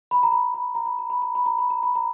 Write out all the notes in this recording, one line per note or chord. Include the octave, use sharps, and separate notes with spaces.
B5
A#5
B5
B5
A#5
B5
A#5
B5
A#5
B5
A#5
B5
A#5
B5
A#5